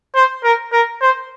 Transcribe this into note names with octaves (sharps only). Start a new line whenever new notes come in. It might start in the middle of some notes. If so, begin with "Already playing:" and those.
C5
A#4
A#4
C5